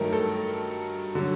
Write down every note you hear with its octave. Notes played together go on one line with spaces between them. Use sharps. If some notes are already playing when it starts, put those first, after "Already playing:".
Already playing: G2 D#3 F#3 A3 A#4
A4
D3 F#3